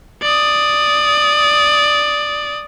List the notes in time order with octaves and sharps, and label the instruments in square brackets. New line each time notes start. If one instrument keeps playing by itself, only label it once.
[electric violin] D5 D#6